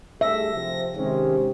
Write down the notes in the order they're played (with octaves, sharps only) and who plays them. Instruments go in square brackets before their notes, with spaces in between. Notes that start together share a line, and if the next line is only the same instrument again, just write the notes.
[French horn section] G2 A3 G#4 [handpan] E5 [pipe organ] A#6
[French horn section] C3 F3
[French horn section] C3 [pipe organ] D#3 G#3 C#4